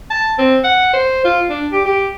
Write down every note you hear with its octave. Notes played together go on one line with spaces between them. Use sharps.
A5
C4
F#5
C5
F4
D4
G4
G4